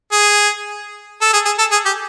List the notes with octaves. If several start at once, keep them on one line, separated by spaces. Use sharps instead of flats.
G#4
A4
G#4
G#4
A4
G#4
G4